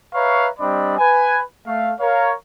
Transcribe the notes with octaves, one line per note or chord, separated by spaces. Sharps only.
B4 C#5 E5 F5 A#5 C#6
G3 C4 D4 D5 D#5 B5
B4 G#5
A3 F5
A#4 C#5 F5